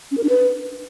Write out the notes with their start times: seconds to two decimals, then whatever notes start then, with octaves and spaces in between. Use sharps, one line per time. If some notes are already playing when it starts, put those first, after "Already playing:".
0.11 C#4
0.17 A#4
0.23 D4
0.29 B4